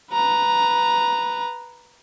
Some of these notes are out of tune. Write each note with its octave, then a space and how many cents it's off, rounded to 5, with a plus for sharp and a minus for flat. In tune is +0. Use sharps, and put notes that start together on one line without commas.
B4 +0 A#5 +0